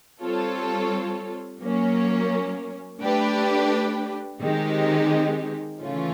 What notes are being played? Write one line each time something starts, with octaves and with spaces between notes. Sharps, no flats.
G3 C4 F4 A4 C#5
F#3 A#3 C#4
A3 D4 G4 B4
D#3 G#3 C4 D#4 G4
C#3 E3 A3 C#4 F4